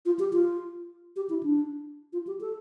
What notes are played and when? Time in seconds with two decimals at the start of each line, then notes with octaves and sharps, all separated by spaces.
0.06 F4
0.19 G4
0.33 F4
1.16 G4
1.30 E4
1.43 D4
2.13 F4
2.27 G4
2.41 A4